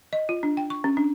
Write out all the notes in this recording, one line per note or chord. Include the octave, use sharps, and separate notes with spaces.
D#5
F4
D4
G5
C#6
C#4
D4